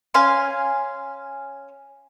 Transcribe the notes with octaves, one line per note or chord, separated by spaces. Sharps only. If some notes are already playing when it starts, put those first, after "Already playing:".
C#4 F5 G#5 C6